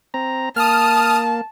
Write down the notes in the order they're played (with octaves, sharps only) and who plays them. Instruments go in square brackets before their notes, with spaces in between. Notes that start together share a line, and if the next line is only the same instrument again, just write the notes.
[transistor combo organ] C4 A#5
[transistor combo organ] A#3 [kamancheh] A5 [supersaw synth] D#6 F6